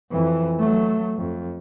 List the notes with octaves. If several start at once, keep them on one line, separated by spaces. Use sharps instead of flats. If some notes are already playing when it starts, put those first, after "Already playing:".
F2 E3
F#3 A3
F2